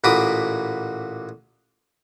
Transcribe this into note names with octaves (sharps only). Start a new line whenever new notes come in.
A1 A#2 F#4 B5 D6 D#6